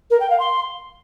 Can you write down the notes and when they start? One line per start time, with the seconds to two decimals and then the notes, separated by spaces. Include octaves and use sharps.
0.10 A#4
0.20 G5
0.30 F5
0.39 C6